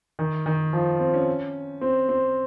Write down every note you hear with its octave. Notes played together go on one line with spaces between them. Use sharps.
D#3
D#3
F3
C4
C#4
C4
C4